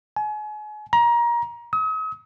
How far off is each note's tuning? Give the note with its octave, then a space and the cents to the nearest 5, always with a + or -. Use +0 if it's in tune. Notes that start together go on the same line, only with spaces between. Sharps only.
G#5 +35
A#5 +25
D#6 +45